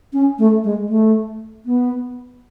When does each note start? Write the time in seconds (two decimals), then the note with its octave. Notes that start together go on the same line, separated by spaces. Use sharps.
0.13 C#4
0.39 A3
0.64 G#3
0.89 A3
1.66 B3